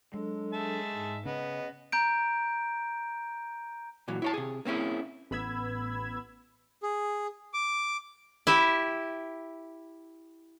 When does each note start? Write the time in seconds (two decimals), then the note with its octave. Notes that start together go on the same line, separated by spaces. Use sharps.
0.14 F#3 G#3 D4 A4
0.53 G#4 E5 A5
0.94 G#2
1.26 C#3 B3 D#5
1.92 A#5 G6 D7
4.08 A#2 E3 F#3
4.22 E4 C#5 A5
4.34 C3 G#4
4.65 A#3 C4 C#4 E4 G#4
5.31 A1 B3 B5 E6 G#6
6.83 G#4
7.54 D6
8.47 E4 G4 E5